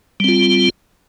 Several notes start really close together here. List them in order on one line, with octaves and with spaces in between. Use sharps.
G3 C4 F4